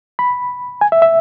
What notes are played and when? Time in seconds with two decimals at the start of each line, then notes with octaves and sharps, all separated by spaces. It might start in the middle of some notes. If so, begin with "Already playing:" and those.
0.19 B5
0.81 G#5
0.92 E5
1.02 E5